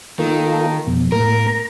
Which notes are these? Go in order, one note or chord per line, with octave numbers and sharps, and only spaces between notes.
D#3 A#3 F4 A4
F2 B2
A2 A#3 A#4
A#5